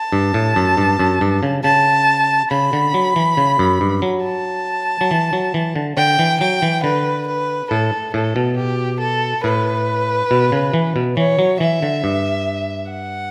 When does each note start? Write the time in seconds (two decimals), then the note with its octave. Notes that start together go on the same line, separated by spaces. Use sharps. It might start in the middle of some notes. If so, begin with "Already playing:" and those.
Already playing: A5
0.13 G2
0.34 A2
0.56 F#2
0.77 G2
0.99 F#2
1.21 G2
1.43 C#3
1.64 C#3 A5
2.51 C#3 B5
2.73 D3
2.94 F#3
3.16 E3
3.37 C#3
3.59 F#2
3.81 G2
4.02 F#3
4.24 A5
5.01 F#3
5.11 E3
5.33 F#3
5.54 E3
5.76 D3
5.97 D3 G5
6.19 E3
6.41 F#3 G5
6.62 E3
6.84 D3 B4
7.28 B4
7.71 A2 A4
8.14 A2 A4
8.36 B2
8.57 G4
9.00 A4
9.44 A2 B4
10.31 B2
10.52 C#3
10.74 E3
10.96 B2
11.17 E3 C#5
11.39 F#3
11.60 E3 E5
11.83 D3
12.04 G2
12.90 F#5